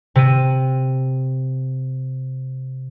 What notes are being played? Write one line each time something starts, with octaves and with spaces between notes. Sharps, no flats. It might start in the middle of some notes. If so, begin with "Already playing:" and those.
C3 D#7